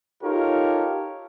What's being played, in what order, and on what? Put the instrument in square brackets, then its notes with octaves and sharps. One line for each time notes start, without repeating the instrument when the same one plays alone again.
[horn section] D#4 F4 G4 A4 A#4 C#5